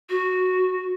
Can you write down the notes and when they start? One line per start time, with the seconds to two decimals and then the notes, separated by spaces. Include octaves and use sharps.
0.10 F#4